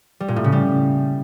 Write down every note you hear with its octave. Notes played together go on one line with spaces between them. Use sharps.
G3
A#2
A2
C#3
G3